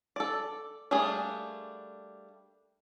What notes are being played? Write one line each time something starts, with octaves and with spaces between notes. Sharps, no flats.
A4 D5
G3 A3 A#3 D4 G#4